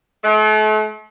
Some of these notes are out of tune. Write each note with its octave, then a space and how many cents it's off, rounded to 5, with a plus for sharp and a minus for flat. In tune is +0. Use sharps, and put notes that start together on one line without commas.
A3 -40